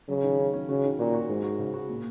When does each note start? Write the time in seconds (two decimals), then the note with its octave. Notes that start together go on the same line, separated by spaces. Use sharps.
0.09 C#3 F#3
0.23 D#3
0.38 C#4
0.54 C#4
0.69 C#3 F#4
0.84 D#3
0.99 A#2 F#4
1.14 F#4
1.29 G#2 G#3
1.44 F#4
1.59 C#3
1.74 F#4
1.90 A#2